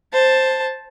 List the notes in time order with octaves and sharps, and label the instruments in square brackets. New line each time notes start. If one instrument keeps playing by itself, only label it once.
[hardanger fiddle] C5 A5